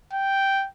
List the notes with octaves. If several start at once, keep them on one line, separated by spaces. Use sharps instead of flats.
G5